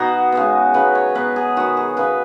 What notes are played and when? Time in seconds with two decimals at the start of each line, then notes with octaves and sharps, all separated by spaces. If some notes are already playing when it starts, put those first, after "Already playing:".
Already playing: B2 B3 D#4 F#4
0.32 C#3 G#3 B3
0.74 C#3 F#3 B3 B4
0.95 C#5
1.15 B2 F#3 B3 B4
1.36 G#4
1.57 D#3 B3 F#4
1.77 G#4
1.97 C#3 B3 B4